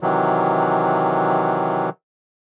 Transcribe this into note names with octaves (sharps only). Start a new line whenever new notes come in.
C3 D#3 E3 F#3